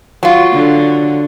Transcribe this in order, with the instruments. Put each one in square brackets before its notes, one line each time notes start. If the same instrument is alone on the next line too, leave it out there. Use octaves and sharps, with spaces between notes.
[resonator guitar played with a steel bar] F#3 F4
[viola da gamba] D3